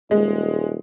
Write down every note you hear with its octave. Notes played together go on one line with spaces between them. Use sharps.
D#1 G#3